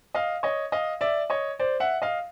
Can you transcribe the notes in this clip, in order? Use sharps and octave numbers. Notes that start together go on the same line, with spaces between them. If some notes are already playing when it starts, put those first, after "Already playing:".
D#5 F5
C#5 D#5
D#5 F5
D5 E5
C#5 D#5
C5 D5
E5 F#5
D#5 F5